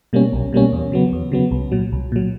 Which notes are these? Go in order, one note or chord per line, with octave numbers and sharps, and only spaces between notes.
B2 G3 A#3 C#4
B1
B2 G3 A#3 C#4
E2
C#3 F#3 B3
E2
C#3 F#3 B3
C2
A#2 F#3
C2
A#2 F#3